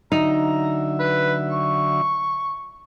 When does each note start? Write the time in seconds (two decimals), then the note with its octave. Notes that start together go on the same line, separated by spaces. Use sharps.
0.12 D3 F#3 D#4 E5 A#5
1.00 B4
1.50 C#6